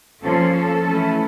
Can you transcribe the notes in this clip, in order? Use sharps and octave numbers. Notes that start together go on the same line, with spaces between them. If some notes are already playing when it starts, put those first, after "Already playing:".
F3 A#3 C#4 A4
A4
E3 A3 C#4 E4